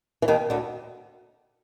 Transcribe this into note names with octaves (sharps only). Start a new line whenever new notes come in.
E3
D#2 D#3
D2 D3